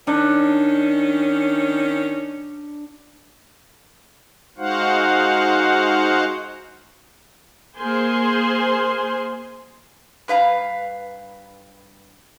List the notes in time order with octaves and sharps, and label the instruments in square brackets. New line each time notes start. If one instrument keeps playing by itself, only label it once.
[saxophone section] D#3 C#4 [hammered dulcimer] D4
[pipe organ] G#3 D#4 F#4 C5 F5 F#5
[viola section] A#3 G#4 C5 G#5 C6
[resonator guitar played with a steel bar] G2 B4 F5 A#5